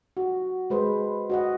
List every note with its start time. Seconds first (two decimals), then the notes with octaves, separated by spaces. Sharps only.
0.17 F#4
0.70 G#3 B4 C5
1.30 F#4 D#5 F#5